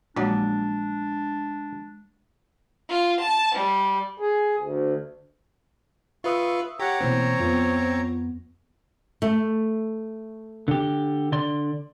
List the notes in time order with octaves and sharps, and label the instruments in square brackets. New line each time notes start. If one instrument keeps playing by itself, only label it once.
[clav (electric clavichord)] A#1 F#3 D5 [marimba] G#3 [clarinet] D4
[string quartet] F4
A5
G3
[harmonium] G#4
D2
[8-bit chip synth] F4 B4 [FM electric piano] E5 D#6 E6 [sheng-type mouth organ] C#6
[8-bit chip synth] G4 F#5 [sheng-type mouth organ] C#5 A#5
[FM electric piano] B2 E3 A#3 [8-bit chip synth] C4
[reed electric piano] F2 B3 [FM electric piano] F4 C#6
[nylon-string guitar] A3
[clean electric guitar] D3 G4
D3 D5 C6